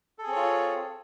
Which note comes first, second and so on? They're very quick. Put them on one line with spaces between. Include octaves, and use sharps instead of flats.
A4 G#4 C4 C#5 F4